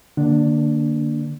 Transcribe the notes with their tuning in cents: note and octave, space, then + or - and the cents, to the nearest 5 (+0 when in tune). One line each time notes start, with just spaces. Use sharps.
D3 +35 A#3 +0 D4 +0